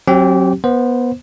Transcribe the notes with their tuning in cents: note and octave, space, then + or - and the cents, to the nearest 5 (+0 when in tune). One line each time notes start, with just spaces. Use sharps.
F#3 +0 C4 +40 G4 -25
B3 -20 C5 -5